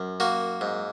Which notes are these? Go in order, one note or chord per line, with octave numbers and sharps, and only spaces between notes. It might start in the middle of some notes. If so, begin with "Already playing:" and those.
Already playing: F#2
A#3 F#4
G#2